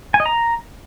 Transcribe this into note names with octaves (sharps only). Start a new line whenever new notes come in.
G#5
D#5
A#5